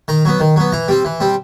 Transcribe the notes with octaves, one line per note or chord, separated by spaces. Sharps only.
D#3 A#5
F#3 B3
D#3
F#3 B3
E3 A#5
G3 C4
E3
G3 C4